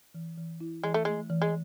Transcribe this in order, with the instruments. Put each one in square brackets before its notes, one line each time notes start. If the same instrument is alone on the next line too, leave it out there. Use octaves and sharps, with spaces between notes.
[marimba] E3
E3
E4
[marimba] E3 [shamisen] G#3
[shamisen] A3
[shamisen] G#3 [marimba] A3
[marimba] E3
[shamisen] G#3